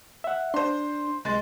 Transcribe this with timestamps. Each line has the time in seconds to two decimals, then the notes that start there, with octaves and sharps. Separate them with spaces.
0.24 E5 F#5
0.54 D4 C5 C6
1.25 C2 G#3 C6 A6